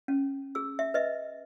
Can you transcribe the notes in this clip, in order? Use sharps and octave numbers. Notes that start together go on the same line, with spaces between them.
C#4
G#4 E6
E5
B4 D#5 E5